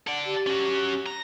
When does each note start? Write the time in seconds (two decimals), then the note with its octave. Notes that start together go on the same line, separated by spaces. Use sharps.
0.07 A4 D5 F#5
0.25 G4
0.47 C#4 F#4
1.06 A#5